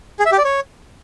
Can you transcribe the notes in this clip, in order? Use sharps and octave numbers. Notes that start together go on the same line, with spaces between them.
G#4
E5
G4
D5
C#5